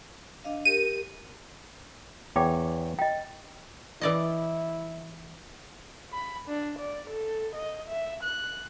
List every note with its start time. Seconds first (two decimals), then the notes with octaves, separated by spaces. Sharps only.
0.44 D4 D#5 F5
0.65 G4 A#4 D#7
2.36 E2 C#5 G5 D6
2.99 D#5 G5
4.01 E3 E4 D5 D#5
6.12 B5
6.48 D4
6.79 D5
7.10 A4
7.55 D#5
7.88 E5
8.23 F#6